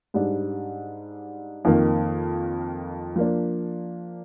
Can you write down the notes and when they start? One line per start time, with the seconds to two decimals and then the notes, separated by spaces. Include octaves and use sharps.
0.14 G#2 G3 D4
1.65 F2 D#3 A#3
3.16 F3 A#3 D4